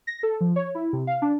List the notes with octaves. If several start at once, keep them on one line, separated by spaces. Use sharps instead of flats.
A#6
A4
F3
C#5
E4
C3
F5
D4